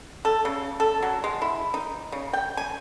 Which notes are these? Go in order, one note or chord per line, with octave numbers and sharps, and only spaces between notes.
A4
C#3
A4
F#3
G#3
E4
D#4
C#3
G5
G#5